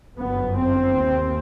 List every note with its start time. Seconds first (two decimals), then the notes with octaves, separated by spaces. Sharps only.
0.17 G1 F#2 B3
0.56 C4
0.95 D#2